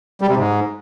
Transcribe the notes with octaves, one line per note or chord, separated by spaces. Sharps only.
G3
C3
G#2